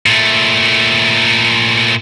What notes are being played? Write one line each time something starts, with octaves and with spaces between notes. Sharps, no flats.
A#2 A3